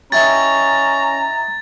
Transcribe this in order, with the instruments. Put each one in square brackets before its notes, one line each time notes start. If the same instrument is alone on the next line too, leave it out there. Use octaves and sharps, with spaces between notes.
[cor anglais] C#4 [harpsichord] D#4 E4 G4 [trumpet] A#5 [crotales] A6